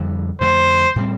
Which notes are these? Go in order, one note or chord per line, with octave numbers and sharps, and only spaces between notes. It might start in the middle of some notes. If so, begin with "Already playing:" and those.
Already playing: F2 D3 G3
F2 D3 A3 C5
A2 G3 C4